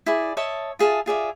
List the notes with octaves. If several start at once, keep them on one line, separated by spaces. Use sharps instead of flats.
E4 G#4 D5
C#5 D#5 E5 A5
F4 G#4 E5 A5
F4 G#4 D5 E5